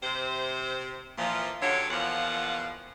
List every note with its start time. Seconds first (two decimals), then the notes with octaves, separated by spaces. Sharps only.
0.03 C3 C5
1.18 A#2 E3 F3
1.62 D3 F#3 F4 G4 A4 C#5
1.90 E2 B2 F3 A#3 F4 F#5